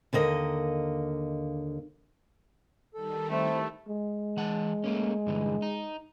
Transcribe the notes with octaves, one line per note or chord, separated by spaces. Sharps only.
D#2 D3 A#3 D#5
D#3 G3 A4
A3 C4 E4
G#3
E3 F#5 A5
A3 A#3 C#4
G2 D3 E3
D#4